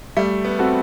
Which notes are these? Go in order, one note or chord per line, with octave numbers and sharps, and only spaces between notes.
G3 A3
B3
C4 F#4 A4